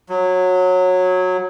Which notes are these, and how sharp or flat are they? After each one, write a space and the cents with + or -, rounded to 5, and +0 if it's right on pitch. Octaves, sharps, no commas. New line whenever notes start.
F#3 -15